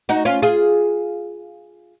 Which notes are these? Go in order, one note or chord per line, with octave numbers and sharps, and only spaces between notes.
D#4 F#4
C#4 F4
F4 G#4